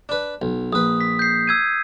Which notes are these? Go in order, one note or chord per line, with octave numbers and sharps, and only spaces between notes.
D4 B4
B1
A#1 B4 D#6
B6
G6 C7
E6 G#6 D#7